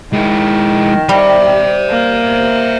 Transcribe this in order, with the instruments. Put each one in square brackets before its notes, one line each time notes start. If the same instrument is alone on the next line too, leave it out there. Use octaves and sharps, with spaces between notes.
[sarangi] D#3 [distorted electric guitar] G#3 E4
[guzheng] G3 [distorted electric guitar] C5 E5
[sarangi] A#3